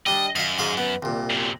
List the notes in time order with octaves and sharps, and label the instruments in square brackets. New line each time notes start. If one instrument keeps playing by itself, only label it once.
[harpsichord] G3 D4 [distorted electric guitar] D#5
[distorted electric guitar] F#2 [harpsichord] D#5 F5
[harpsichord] G#2 G#4 F5
B3
C2 A#2
[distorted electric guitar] F#2 C3